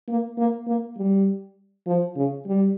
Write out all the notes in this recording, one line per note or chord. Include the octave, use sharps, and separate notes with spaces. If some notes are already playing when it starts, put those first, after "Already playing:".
A#3
A#3
A#3
G3
F3
C#3
G3